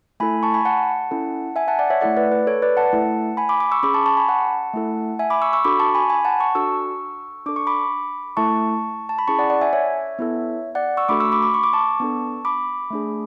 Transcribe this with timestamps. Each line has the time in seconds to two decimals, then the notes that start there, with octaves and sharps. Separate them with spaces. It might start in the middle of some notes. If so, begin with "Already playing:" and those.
0.20 A3 E4 A4 G#5 B5
0.43 A5 C#6
0.54 G#5 B5
0.65 F#5 A5
1.11 C#4 E4 A4
1.56 E5 G#5
1.68 F#5 A5
1.79 D5 F#5
1.90 C#5 E5
2.01 A3 E4 A4 D5 F#5
2.17 B4 D5
2.32 B4
2.47 A4 C#5
2.62 B4 D5
2.77 F#5 A5
2.93 A3 E4 A4
3.37 G#5 B5
3.49 B5 D6
3.60 B5 D6
3.72 C#6 E6
3.83 C#4 G#4 B5 D6
3.94 A5 C#6
4.06 A5 C#6
4.17 G#5 B5
4.29 F#5 A5
4.74 A3 E4 A4
5.19 E5 G#5
5.30 B5 D6
5.42 C#6 E6
5.53 C#6 E6
5.64 D4 F#4 A4 B5 D6
5.79 A5 C#6
5.95 G#5 B5
6.10 G#5 B5
6.25 F#5 A5
6.40 A5 C#6
6.55 D4 F#4 A4 C#6 E6
7.46 D4 A4 D6
7.56 C#6
7.67 B5 D6
8.37 A3 E4 A4 A5 C#6
9.09 A5
9.19 B5
9.28 C#4 E4 G#4 A5 C#6
9.39 D5 F#5
9.50 D5 F#5
9.61 E5 G#5
9.73 C#5 E5
10.19 B3 E4 A4
10.75 D5 F#5
10.97 C#6 E6
11.09 A3 D4 F#4 A4 B5 D6
11.20 C#6 E6
11.32 B5 D6
11.43 B5 D6
11.54 C#6
11.63 D6
11.73 A5 C#6
12.00 B3 D4 A4
12.45 B5 D6
12.90 A3 D4 G#4